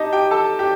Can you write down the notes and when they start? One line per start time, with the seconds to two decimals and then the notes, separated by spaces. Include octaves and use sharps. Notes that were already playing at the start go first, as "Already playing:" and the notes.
Already playing: D#4 G4 D#5 A5
0.13 G4 G5
0.31 A4 A5
0.59 G4 G5